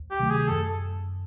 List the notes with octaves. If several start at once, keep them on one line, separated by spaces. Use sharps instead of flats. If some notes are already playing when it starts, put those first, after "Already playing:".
Already playing: D2
G4
C3 D#3 F#3 A3
G#4
F#2 A4